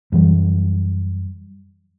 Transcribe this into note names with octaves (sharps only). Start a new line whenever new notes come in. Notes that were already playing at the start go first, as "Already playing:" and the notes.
F#2 E3 G3